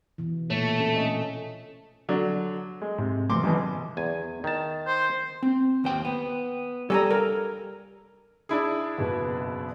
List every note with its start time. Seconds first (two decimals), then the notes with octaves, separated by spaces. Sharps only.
0.18 B2 E3
0.50 A#2 A3 C#5
0.78 C4 C#4 A4
0.96 A4 D#5
2.09 D3 F#3 D4
2.82 G#3
2.98 G#2 C3
3.30 E2 C3 F3 A3 C6 D6
3.43 E2 G#2 B2 D#3 F#3 C#4
3.97 E2 G#5
4.44 D#3 A5
4.87 C5
5.43 C4
5.84 D#2 C5 G5
6.05 B3
6.90 G3 A4 G#5 A#5
7.11 A#4
8.49 D4 E4 G#4
8.98 F#1 B2